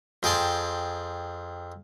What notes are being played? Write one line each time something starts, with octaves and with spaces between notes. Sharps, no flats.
F2 G#4 G5 A5 C6